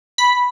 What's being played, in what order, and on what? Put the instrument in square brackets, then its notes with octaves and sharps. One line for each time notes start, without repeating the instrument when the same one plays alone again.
[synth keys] B5